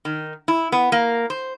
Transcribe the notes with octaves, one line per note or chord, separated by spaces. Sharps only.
D#3
E4
B3
A#3
C5